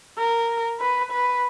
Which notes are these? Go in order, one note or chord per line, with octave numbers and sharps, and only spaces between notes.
A#4
B4
B4